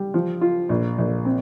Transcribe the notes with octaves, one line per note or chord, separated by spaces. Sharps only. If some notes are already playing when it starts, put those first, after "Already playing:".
Already playing: G3
F3
F4
A#1
A#1
C4